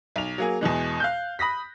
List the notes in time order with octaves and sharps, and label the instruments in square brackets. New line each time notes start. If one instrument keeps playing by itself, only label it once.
[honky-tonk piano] B1 F7
F#3 A#3 G#4
E2 B2 E3 G#3
F5 F#6 G6
B5 D#6 A#6 B6